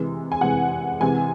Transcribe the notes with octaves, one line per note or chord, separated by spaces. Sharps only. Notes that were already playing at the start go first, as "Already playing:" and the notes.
Already playing: C3 E3 G#3
G#5
C3 E3 G#3 F#5
C3 E3 G#3 G#5